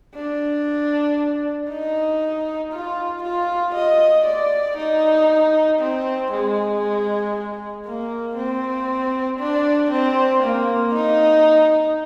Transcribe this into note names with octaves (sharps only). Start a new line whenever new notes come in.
D4
D#4
F4
F4
D#5
D5
D#4
C4
G#3
A#3
C4
D4
C4
A#3
D#4